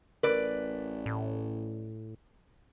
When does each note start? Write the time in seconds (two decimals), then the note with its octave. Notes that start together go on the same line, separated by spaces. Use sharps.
0.23 A1 A#4 B4 D5
1.06 A2